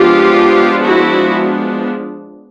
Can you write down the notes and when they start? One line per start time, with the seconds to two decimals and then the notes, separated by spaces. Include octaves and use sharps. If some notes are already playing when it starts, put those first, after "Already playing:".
Already playing: F3 G#3 B3 D4 F4 G4
0.85 E4 F#4